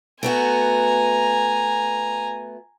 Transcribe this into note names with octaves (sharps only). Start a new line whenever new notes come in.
A3 B3 F#4 G#5 A#5